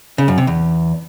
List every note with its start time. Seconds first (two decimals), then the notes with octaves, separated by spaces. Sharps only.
0.18 C#3
0.28 F#2
0.38 C3
0.47 E2